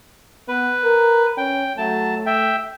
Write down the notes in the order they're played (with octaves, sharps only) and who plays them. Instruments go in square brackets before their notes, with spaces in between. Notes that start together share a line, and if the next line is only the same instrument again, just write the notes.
[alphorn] B3 [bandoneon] B4
[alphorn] A#4
[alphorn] C#4 [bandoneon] G5
[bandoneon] F#3 A5 [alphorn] A3
[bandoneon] E5 G5